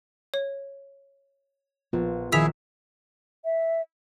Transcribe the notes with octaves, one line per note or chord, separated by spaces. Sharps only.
C#5
A#1 B3 F4
A#1 D#3 E4 G#4 E6 B6 E7 F7
E5